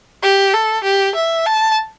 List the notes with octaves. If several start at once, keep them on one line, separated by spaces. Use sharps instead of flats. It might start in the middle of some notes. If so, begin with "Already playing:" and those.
G4
A4
G4
E5
A5